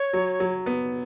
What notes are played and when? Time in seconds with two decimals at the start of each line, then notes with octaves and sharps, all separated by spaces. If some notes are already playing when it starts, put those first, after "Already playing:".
Already playing: C#5
0.13 F#3
0.40 F#3
0.66 B3